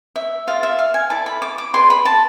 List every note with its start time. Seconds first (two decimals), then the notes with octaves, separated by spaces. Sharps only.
0.16 E5
0.47 F4 G#4 D5 F5
0.63 E5
0.79 F5
0.94 G#5
1.10 E4 A4 D5 A5
1.26 B5
1.42 D6
1.58 D6
1.74 G#4 B4 D5 C6
1.90 B5
2.05 A5